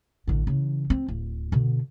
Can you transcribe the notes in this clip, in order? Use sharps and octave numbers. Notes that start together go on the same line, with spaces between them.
A1 D3
C#3 E3
C4
D1
B2 D3